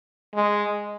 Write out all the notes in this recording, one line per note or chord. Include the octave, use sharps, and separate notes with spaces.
G#3